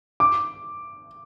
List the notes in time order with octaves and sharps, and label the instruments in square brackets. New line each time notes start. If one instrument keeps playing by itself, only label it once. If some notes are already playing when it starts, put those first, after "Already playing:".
[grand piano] D6